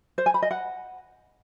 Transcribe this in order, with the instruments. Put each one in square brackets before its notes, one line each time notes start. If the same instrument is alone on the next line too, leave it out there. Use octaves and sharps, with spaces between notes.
[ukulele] C5
G#5
B5
D#5
F#5